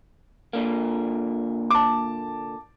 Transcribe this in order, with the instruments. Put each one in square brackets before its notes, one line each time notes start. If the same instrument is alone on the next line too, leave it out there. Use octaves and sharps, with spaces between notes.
[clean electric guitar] A#2 D3 A#3
[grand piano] A5 D6